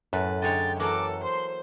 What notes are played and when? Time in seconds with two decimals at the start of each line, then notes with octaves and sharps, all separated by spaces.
0.13 F#2 A2 B4 A5
0.42 D3 G#3 C#5 G5 A6
0.80 E3 F#3 A#3 A4 D6
1.24 C5 C6